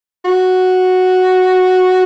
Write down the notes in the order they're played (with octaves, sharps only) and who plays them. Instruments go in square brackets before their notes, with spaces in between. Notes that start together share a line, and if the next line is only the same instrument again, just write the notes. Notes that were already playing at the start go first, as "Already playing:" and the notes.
[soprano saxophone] F#4